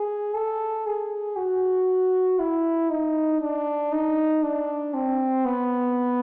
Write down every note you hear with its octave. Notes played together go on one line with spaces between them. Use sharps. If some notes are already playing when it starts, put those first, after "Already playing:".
Already playing: G#4
A4
G#4
F#4
E4
D#4
D4
D#4
D4
C4
B3